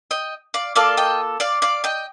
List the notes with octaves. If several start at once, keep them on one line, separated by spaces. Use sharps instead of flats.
D#5 G5
D5 F5
A#3 F4 A4 D5 F5
D#5 G5
D5 F5
D5 F5
D#5 G5